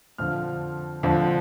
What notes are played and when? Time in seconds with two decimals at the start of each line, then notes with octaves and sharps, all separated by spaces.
0.18 F2 D3 F3 F6
1.03 F2 D3 F3